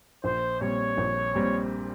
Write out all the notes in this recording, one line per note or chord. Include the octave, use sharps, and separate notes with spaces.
A#1 C5
A#2 G3 C4 C#5
A#1
A#2 G3 C4